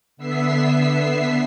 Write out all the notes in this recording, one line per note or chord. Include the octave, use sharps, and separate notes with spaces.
D3 B3 E5 E6 B6 C7